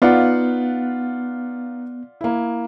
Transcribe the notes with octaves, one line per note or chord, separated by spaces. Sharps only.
B3 D#4 F4 B4 D5 F5 F#5
A#3 E4